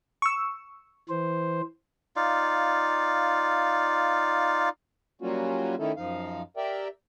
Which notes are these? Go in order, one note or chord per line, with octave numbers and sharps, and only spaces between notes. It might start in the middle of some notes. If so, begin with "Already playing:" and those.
C#6 E6
E3 C5
D#4 F4 D5 F5
F#3 G3 A#3 C#4 F4 F#4
D#3 A3 C#4 D#4 E4 A4
F#2 F3 D#4 F5
G4 A#4 D5 E5 G5